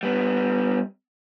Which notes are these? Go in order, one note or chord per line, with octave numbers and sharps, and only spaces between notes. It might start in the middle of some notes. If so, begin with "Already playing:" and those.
G3 B3